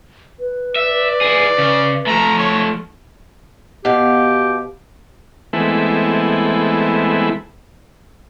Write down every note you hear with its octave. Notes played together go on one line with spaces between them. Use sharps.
B4
D5 E5
E4 G#4
C#3
F3 A3 A#5
C#5
B2 G4 F5
E3 G#3 A3 B3 C4 E4